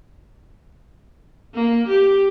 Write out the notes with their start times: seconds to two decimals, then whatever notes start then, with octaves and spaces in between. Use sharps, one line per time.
1.54 A#3
1.88 G4